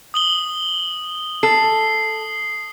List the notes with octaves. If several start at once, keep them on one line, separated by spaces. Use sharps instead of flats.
D#6 F#7 G7
A4 C7